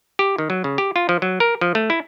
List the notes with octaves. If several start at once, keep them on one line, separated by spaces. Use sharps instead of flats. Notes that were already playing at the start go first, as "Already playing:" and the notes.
G4
D#3
F#3
C#3
G4
F4
F3
F#3
A#4
F3
A3
E4